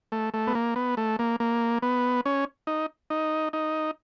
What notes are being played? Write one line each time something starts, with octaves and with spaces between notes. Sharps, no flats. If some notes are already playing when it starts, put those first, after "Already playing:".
A3
A3
B3
A#3
B3
A3
A#3
A#3
B3
C#4
D#4
D#4
D#4